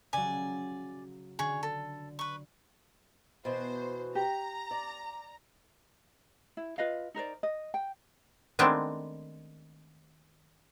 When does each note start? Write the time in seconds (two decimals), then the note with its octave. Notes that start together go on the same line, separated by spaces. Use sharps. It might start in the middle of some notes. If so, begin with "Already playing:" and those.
0.13 C#3 F#3 D5 G#5
1.39 D3 G#4 C#5
1.63 A4
2.19 B4 C#6
3.45 B2 E3 F#4 C5
4.15 G4 A#5
4.71 D5
6.57 E4
6.78 F4 B4 D#5 F5
7.14 D#4 A#4 C5 D5
7.43 D#5
7.74 G5
8.59 D#3 G#3 A3 B3 C4 D4